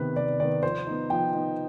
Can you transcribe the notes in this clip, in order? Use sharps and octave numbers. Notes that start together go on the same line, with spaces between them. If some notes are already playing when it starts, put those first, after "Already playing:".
Already playing: C3 D#3 B3 B4
C3 D5
D#3 B3 D5
F3 C5
B3 D#4
F3 G5
B3 D#4